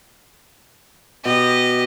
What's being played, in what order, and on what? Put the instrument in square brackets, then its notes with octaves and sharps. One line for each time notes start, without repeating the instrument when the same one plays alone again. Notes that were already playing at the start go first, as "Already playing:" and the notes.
[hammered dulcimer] B2 [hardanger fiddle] G4 D#5